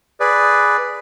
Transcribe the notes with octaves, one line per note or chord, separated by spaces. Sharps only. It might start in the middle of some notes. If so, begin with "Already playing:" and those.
G#4 B4 D5